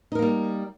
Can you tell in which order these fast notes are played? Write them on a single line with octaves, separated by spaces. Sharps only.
D#4 A#4 A#3 G3